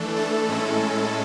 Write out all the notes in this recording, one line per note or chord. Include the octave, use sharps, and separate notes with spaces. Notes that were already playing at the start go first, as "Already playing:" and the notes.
Already playing: E3 A3 D4 A4
A4
A2 G#3 C#4 E4